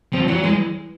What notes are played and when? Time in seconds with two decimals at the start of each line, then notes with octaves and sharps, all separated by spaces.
0.13 F3 C4
0.28 E3 F#3
0.44 E3 G#3